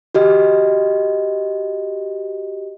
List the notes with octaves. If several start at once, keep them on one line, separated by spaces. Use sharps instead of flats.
F#4 G4 D#5